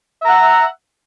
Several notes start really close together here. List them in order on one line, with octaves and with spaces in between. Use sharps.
E5 A#5 F#5